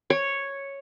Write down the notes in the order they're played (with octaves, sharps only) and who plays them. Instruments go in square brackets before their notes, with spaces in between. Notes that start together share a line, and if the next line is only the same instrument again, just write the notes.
[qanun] C#5